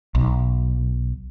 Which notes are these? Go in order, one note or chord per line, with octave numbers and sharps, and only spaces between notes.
B1